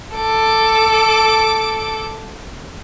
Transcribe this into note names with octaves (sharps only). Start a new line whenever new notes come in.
A4 D6